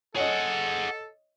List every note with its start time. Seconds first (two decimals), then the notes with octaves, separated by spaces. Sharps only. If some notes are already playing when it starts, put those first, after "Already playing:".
0.15 G#4 A4 C#5 D#5 F#5